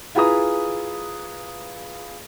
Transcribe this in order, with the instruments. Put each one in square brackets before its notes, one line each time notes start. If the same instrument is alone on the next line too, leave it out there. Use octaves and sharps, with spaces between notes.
[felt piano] E4 F4 G#4 B4 A#5 D#6